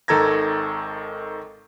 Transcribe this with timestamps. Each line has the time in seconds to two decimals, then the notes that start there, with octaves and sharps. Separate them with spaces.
0.08 G#1 D#3 A4 A#5 G#6 A#6